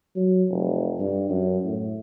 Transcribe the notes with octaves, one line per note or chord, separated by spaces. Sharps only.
F#3
F1
G2
F#2
A2